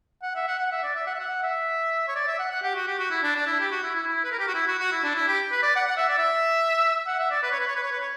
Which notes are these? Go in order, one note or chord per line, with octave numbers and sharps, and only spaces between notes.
F#5
E5
F#5
F#5
E5
D5
E5
F#5
E5
F#5
E5
C#5
D5
E5
F#5
F#5
G4
F#4
G4
F#4
E4
D4
D4
E4
G4
F#4
E4
E4
E4
B4
A#4
G4
F#4
E4
F#4
F#4
E4
D4
E4
G4
B4
D5
F#5
F#5
E5
D5
E5
F#5
E5
D5
B4
C#5
B4
C#5
B4
C#5
B4
C#5